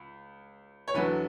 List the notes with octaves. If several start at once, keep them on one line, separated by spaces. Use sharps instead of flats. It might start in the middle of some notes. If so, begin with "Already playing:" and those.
Already playing: C#2
C#5
E2 D3 F#3 B4